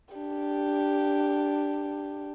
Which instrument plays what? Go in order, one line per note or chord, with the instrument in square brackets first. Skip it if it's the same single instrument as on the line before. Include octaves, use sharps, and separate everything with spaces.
[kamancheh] D4 G4